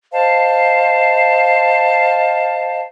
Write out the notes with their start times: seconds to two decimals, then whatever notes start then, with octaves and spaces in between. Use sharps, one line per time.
0.12 C5 D#5 F5 A5